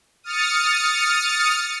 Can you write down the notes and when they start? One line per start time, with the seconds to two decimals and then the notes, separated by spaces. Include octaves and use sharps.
0.23 D#6 F6 A6 C#7